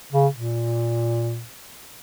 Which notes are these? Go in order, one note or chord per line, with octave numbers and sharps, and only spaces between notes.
C#3
A#2